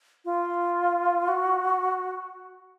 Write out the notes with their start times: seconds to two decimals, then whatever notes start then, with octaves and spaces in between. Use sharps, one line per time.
0.25 F4
1.28 F#4